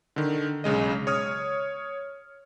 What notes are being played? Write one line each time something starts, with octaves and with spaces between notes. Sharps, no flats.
D3 D#3
B1 C#3 G#3 D#5
C#5 D#6 F6